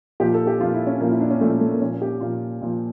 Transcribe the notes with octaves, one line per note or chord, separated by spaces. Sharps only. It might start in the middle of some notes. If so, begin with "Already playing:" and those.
A#2 F3 G4
A4
G4
A#2 F3 F4
E4
C#4
A#2 F3 A#3
E4
D4
C#4
A#2 F3 A3
A3
A3
A#3
A#2 F3 C#4
G4
A#2 F3 F4
A#2 F3